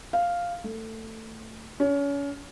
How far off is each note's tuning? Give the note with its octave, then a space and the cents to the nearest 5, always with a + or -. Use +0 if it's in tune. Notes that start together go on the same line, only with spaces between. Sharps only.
F5 +0
A3 +20
C#4 +30